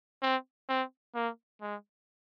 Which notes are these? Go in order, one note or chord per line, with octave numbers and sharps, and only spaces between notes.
C4
C4
A#3
G#3